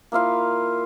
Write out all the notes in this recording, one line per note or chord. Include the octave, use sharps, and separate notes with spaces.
A#3 E4 F4 F5